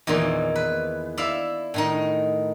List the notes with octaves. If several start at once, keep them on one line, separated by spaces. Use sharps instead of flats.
E2 A#2 D#3 E3
B4
E4 D5 E5 F5
A2 D#3 D#4